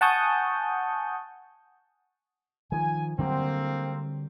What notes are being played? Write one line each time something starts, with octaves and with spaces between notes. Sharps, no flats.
F#5 G#5 A5 C#6 D#6 G6
D#3 F3 G#5
D3 F#3 G3 A#3 C4